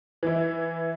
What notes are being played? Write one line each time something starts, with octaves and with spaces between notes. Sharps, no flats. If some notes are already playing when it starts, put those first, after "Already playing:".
E3 E4